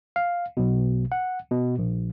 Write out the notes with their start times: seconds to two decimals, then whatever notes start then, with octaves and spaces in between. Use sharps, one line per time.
0.16 F5
0.57 B1 B2
1.12 F#5
1.51 B2
1.79 A#1